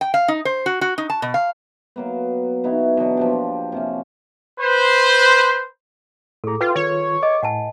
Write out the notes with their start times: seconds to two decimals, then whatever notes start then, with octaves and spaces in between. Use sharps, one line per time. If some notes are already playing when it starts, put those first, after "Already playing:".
0.01 G5
0.14 F5
0.28 D#4
0.45 C5
0.66 F#4
0.81 F#4
0.98 D#4
1.10 A5
1.22 B2
1.34 F5
1.96 F#3 A#3 B3
2.64 B3 D#4 E4 F#4
2.97 B2 E3 F#3 D4
3.17 F3 A#3 G4
3.72 C3 A#3 C#4
4.59 B4 C5
6.44 A2 G#4 A4 A#5
6.61 F4 B4 G5
6.76 D#3 F4 C#5
7.23 D#5 D6
7.42 A2 F#5 G#5 A5